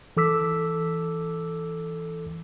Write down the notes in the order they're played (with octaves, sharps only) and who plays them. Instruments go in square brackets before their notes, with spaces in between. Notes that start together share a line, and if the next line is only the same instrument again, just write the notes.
[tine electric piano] E3 A4 D6 E6 B6